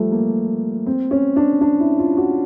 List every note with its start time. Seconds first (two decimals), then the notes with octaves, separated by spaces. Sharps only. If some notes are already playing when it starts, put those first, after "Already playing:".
Already playing: F3 G3 A3
0.12 A#3
0.87 C4
1.11 C#4
1.36 D4
1.61 D4
1.80 E4
1.99 F4
2.17 F#4